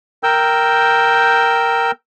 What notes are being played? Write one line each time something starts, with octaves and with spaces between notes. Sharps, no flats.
A#4 G5 E6 G6